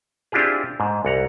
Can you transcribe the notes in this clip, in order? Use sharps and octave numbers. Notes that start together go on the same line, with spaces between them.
C4 D4 E4 F4 G4 G#4
G#2
C2 F#5 A#5